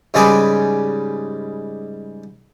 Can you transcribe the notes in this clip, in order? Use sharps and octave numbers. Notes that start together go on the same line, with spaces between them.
G#2 C#3 G3 G#4 B4 D6